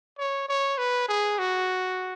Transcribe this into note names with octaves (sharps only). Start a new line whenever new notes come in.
C#5
C#5
B4
G#4
F#4